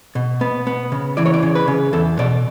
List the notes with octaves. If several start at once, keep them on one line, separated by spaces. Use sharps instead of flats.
B2
B3
B3
C#3
E3 D5
C#5
D5
C#3
B4
C#3
E2 A4
B2 D5